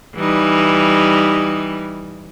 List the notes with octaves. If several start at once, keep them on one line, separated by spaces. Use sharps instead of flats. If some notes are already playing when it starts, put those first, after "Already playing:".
E3 G3 D#4